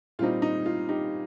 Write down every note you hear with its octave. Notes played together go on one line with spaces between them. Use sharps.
A#2 G3 C4 D#4 F4
D#4
F4
D#4 G4